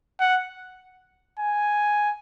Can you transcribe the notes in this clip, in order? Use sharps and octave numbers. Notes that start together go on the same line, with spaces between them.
F#5
G#5